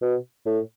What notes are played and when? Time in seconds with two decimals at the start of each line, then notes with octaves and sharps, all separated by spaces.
0.01 B2
0.46 A2